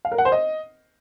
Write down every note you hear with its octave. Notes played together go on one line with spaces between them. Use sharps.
F5
A#4
F#5
C5
D#5